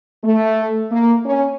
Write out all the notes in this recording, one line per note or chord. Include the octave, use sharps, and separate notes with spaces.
A3
A#3
C#4